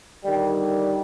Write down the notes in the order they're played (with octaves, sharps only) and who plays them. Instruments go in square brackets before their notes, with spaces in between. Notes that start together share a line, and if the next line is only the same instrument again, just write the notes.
[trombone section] D3 D#3 G3